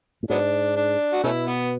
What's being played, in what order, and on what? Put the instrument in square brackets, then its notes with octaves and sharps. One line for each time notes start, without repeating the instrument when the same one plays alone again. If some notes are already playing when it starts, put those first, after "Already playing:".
[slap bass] A2
[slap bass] G#2 [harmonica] F#3 B3 D4
[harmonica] D4
F#4
[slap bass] B2 [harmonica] A3 C#4 E4
[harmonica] B3